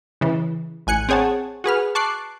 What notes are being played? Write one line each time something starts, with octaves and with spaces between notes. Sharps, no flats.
C#3 E3
A1 G#5 F#6 C#7
C4 G#4 C#5 F#5 A5
F#4 G#4 B4 F6
A5 C#6 D6 F#6 C7